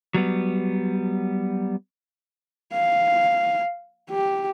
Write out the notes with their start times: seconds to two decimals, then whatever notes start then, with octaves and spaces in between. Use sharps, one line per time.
0.14 F#3 G3 B3
2.73 F5
4.10 G4